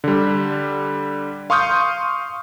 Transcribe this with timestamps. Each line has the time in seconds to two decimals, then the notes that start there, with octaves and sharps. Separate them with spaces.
0.04 D3 G3
1.50 F5 C6 C#6 D#6 F6 G6